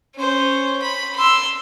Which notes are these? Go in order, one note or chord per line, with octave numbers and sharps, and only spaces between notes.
C#4 C5
B5
C6 E6